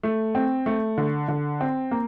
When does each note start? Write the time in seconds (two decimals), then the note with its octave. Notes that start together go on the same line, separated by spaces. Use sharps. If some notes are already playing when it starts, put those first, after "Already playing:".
0.03 A3
0.35 C4
0.66 A3
0.98 D3
1.28 D3
1.61 C4
1.91 A#3